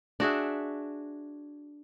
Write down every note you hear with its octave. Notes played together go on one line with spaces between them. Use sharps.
D4 F#4 G#4 E5